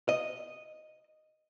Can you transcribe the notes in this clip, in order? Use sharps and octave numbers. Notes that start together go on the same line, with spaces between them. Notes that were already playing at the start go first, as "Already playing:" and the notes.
D#5